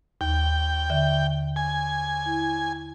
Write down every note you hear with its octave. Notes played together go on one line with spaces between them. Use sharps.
D#2 G5
D3 E5 G6
G#5
E4